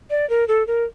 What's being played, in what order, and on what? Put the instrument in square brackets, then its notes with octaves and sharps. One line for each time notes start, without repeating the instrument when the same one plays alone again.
[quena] D5
A#4
A4
A#4